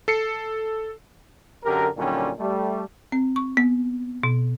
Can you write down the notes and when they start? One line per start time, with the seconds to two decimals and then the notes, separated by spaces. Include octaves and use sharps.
0.08 A4 C7 C#7
1.63 F#2 D3 G4 A#4
1.97 A#2 D3 D#3 F#3 G3 C#4
2.39 G3 A3
3.12 C4
3.36 C#6
3.57 B3
4.23 B2